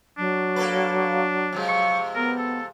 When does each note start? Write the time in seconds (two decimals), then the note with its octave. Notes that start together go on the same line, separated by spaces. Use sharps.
0.18 F#3 D4
0.56 A#3 A4 B4
1.53 C3 F3 G#3
1.68 C#6
2.15 B3 A#4
2.38 A4